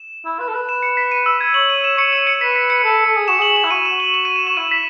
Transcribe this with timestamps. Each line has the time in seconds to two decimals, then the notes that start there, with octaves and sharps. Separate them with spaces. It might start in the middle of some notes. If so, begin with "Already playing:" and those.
Already playing: E7
0.25 E4
0.40 B4
0.48 A4
0.54 B4
0.69 E7
0.83 C#7
0.97 B6
1.12 D#7
1.26 E6
1.41 G#6
1.54 C#5 F#7
1.70 D#7
1.84 E7
1.98 C#5 C#7
2.12 D#7
2.27 C#7
2.41 B4 B6
2.56 B6
2.70 C#7
2.84 A4
3.06 A4
3.17 G#4
3.28 F#4 E7
3.39 G#4 F#7
3.56 E7
3.64 E4
3.71 F#4 D#7
3.85 E7
3.92 F#4
4.00 F#7
4.14 E7
4.25 D#7
4.36 E7
4.47 F#4 E7
4.57 E4 D#7
4.71 B6